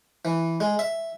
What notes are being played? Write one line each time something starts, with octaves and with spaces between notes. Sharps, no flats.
E3
G#3
E5